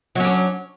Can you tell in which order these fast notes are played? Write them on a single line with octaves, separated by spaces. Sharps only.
F#3 C#4 D4